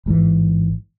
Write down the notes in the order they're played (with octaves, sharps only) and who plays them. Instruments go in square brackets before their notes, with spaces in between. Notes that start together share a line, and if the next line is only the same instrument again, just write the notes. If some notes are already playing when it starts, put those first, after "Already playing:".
[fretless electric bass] A1 G#2 B2 E3